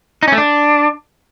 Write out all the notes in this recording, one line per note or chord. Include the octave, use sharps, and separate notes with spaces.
D#4
C#4
A3
D4